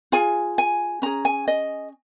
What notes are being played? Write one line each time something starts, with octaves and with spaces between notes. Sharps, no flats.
F4 G#4 G#5
G#5
C#4 G#4 A#5
G#5
D#5